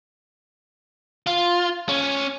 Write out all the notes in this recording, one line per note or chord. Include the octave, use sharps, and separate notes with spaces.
F4
C#4